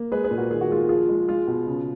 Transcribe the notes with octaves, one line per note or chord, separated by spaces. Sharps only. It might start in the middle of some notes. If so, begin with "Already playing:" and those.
Already playing: A#3
G#3 G#4 B4
G#4 B4
A#2
F#4 A#4
D#3 G#4
F#4
G#3 F4 G#4
F3 F4 G#4
G#3
G#3 F4
B2
C#3